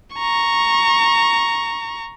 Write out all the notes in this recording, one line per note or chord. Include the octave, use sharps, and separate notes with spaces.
A#5 C#6